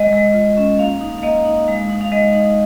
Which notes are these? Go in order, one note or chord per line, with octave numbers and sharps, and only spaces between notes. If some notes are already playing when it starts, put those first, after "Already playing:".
Already playing: G#3 D#5
G#3
F4
C#4
A#3 F5
D#4
F5
A#3 D#5
D#4
G#3 F5
D#4
F5
G#3 D#5
D#4